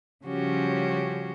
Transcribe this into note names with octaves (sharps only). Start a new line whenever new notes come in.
C#3 F3 G3 C#4 F#4 G4